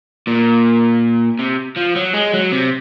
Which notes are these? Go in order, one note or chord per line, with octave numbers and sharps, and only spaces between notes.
A#2
C3
F3
F#3
G#3
F#3
C3